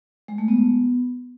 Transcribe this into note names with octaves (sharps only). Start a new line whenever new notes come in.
G#3
A3
B3